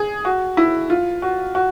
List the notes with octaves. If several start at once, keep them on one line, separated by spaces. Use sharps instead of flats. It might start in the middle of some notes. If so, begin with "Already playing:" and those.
Already playing: G#4
F#4
E4
F4
F#4
F#4